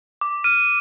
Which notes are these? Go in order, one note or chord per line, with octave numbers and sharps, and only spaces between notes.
D6
F6 D#7